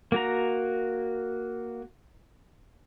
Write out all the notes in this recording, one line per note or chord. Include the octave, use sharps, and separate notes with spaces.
A#3 F#4 A#5